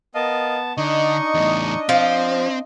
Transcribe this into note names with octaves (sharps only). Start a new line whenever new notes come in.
B3 A#4 D#5 F5 A5
D3 D4 D#4 D#5 C#6
E2 A2
F3 C4 C6